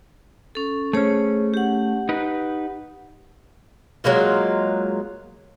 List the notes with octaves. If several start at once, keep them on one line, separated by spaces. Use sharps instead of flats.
C#4 A4
A3 C#4 G#4 C5 C#5
G4 F#5
D#4 B4
F#3 G#3 A#3 F4